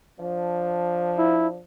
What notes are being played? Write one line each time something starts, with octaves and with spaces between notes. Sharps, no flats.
F3 D4
E4